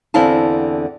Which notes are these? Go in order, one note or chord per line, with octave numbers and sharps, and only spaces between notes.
E2 D3 C4 E4 F5 A5